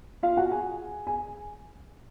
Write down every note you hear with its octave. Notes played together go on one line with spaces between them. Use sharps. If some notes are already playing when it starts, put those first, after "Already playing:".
F4 F5
F#4 F#5
G#4 G#5
G#4 G#5